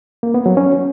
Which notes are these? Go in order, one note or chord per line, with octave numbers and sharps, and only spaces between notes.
A#3
B3
F#3
C#4